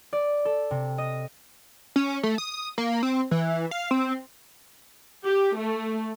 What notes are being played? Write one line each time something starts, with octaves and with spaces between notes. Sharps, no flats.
D5
A4
C3
D#5
C#4
A3
D#6
A#3
C4
E3
F5
C4
G4
A3